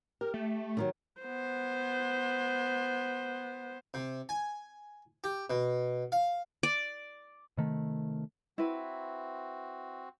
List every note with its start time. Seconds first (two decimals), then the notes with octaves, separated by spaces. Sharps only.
0.21 G4 A#4
0.34 A3
0.77 D3 D#3 F#3
1.22 B3 C5
3.94 C3
4.29 G#5
5.24 G4
5.50 B2
6.12 F5
6.63 D5
7.57 C3 D#3 A3
8.58 C4 E4 F#4 B4